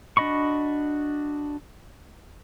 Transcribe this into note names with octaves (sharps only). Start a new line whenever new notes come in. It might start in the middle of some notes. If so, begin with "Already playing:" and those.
D4 F#4 D#5 B5 C#6